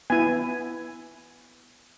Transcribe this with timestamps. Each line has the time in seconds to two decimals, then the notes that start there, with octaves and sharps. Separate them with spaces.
0.10 B3 E4 G#5